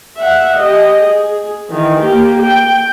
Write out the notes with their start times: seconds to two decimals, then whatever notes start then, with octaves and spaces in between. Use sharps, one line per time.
0.17 E5 F#5
0.57 G4 D#5
1.03 G#4
1.70 D#3 E3
2.00 A#3 G4
2.42 G5